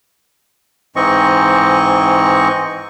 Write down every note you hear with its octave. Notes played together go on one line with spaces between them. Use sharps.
G#2 E3 C4 D#5 C#6